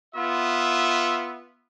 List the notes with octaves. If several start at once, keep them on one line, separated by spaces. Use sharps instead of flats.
B3 F4 E5